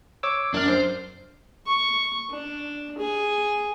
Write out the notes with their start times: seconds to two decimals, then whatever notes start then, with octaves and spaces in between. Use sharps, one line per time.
0.23 C#5 D6 E6
0.54 F#2 D4 F6
0.68 C5
1.66 C#6
2.31 D4
2.98 G#4